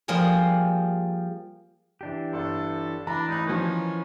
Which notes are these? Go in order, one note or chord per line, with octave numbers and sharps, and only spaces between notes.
F3 G3 A#3 G#4
E3 D4 G4
G1 A4
E3 D4 A#5 B5
A1 D#4 B5 F#6
D#3 F3 C#4